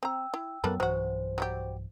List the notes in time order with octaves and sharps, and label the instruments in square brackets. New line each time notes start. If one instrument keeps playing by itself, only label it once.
[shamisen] C4 A#5 [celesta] G5 E6
[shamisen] E4
[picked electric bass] F#2 F#3 B3 [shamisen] A#3 A4 B4
[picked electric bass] B1 G2 E3 [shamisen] F#3 F#4 [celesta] C5
[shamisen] F#3 G3 G4